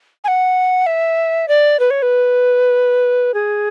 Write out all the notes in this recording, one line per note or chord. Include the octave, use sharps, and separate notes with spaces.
G#5
F#5
E5
D5
B4
C#5
B4
G#4